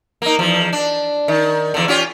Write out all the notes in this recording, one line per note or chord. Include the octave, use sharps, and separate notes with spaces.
A#3 D#4
E2 F3
D4
D#3
E2 D3
C#4 F4 G4